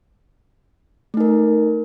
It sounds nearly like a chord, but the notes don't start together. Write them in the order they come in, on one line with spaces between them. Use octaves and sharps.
A3 D#4 A#4